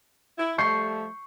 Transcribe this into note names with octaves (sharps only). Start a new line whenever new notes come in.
E4
F3 G3 A3 C#6 G6 C7